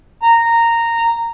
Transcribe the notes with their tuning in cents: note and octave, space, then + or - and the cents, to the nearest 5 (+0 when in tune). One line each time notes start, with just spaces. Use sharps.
A#5 -10